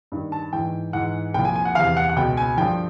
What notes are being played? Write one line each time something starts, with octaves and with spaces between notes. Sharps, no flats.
G2 D#3
A5
G#2 E3 G5
G#2 E3 F#5
C2 A#2 F3 G5
G#5
G#5
F#5
E2 C3 E3 F5
F#5
F#5
C#2 B2 G5
G#5
G2 D3 F3 G5